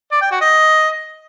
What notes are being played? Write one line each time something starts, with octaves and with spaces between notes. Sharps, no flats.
D5
G5
F#4
D#5